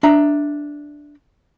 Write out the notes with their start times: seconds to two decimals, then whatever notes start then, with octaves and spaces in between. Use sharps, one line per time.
0.03 D4 E5 A#5